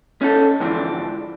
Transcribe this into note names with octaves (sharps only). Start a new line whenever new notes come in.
C#4 D#4 A4
E2 G#2 D3 E3 F3 D4